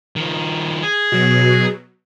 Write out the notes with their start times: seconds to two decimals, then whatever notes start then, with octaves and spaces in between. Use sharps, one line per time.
0.16 D#3 F3
0.82 G#4
1.12 B2 F#3